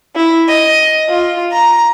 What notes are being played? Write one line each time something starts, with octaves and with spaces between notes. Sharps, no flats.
E4
D#5
F4
A#5